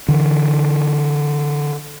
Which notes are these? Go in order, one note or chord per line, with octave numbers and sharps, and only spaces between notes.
D3 E3